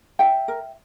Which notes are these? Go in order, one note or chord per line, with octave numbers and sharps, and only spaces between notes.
E4 E5 G5
A#4